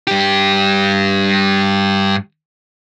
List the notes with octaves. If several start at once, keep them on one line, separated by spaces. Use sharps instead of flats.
G2 G4